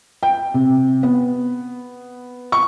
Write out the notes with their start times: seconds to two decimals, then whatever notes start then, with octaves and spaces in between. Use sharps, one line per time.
0.23 G5
0.54 C3
1.03 B3
2.52 C#6